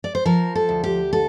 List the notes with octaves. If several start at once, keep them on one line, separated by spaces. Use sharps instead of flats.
D5
C5
F3 A#4
A4
D2
G4
D3 A4